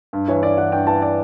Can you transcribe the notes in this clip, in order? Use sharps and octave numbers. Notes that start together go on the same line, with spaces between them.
G2
E3 C#5
G2 D5
E3 F#5
G2 G5
E3 A5
D5